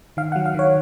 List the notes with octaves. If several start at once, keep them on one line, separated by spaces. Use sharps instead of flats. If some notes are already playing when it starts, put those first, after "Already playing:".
D#3 F5
F#5
F#3
F5
D#3 C#5